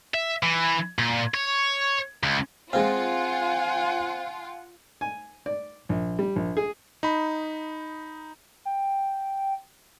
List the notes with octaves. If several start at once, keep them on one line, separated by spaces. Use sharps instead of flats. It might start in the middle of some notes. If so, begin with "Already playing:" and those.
E5
E3
A#2
C#5
C#2
G#3 C4 F4 F5 F#5 G#5
G#5
D5
A#1
G3
A#1
G#4
D#4 B5
G5